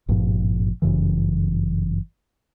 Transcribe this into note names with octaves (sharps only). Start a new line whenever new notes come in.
G#1 G2 A#2 F3
G1 F#2 C#3 E3